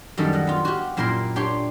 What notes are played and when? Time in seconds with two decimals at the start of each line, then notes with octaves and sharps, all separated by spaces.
0.17 F#2 D#3 G3 A4
0.33 D#5 F#5
0.47 B3 F4
0.65 F#4 G4
0.97 F#2 A#2 E4 A#4 G5 C6
1.36 D4 G4 C#5 G5 C6